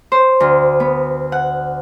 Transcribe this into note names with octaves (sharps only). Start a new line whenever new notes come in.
C5
D2
B3
F#5